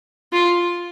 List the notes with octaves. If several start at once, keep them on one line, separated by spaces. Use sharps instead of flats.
F4